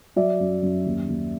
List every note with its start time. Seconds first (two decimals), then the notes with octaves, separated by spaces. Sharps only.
0.16 F#3 D5 E5
0.40 F#2
0.62 F#2
0.85 D#2
1.08 D#2